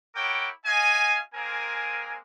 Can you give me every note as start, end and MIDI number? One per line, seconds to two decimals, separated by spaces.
0.15 0.48 64
0.15 0.48 70
0.15 0.48 73
0.15 0.48 78
0.15 0.48 79
0.15 0.48 86
0.65 1.18 66
0.65 1.18 75
0.65 1.18 77
0.65 1.18 80
1.34 2.17 56
1.34 2.17 58
1.34 2.17 60
1.34 2.17 70
1.34 2.17 80